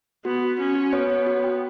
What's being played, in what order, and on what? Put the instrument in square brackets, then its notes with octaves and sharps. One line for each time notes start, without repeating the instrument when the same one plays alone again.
[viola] B3 [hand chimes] F#4
[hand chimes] F#4
[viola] C#4 [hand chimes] F#4
[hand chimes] F#4
[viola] B3 [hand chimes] C#5
[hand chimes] C#5
F#4
G5